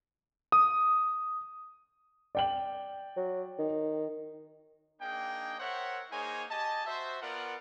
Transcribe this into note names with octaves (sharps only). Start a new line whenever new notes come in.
D#6
D5 G5 F#7
F#3
D#3
A#3 D4 D#4 G#4 G5
A#4 C5 C#5 E5 F#5
A#3 D#4 G#4 C5 C#5 G#5
G4 D#5 G#5 A5
F#4 C5 E5
B3 F4 A#4 D5 F#5